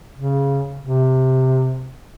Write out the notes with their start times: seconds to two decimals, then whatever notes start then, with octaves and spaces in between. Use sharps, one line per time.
0.15 C#3
0.81 C3